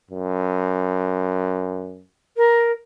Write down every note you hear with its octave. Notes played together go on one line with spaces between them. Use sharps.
F#2
A#4